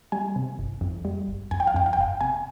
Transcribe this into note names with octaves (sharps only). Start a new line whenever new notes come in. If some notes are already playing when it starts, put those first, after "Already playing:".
G3 G#5
C3
G1
F2
G3
G1
F2 G#5
G5
F5
F2 G5
F5
G5
G1 F5
C3 G#5